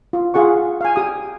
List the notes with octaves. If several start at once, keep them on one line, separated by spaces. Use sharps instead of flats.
F4
F4 G#4 F#5 C#6
F5 G#5
G4 D#6